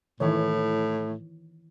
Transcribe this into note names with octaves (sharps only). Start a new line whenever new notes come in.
A2 D#3 E3 C#5